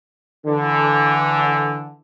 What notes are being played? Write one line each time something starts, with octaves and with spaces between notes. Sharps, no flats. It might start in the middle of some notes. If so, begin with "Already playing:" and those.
D3 E3